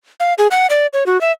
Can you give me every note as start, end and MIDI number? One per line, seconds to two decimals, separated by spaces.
0.20 0.34 77
0.38 0.47 68
0.51 0.67 78
0.70 0.87 74
0.93 1.04 73
1.06 1.20 66
1.21 1.32 76